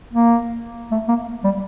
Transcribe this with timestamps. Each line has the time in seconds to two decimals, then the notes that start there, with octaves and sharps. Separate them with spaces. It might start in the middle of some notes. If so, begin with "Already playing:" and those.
0.13 A#3
0.92 A3
1.08 A#3
1.44 G3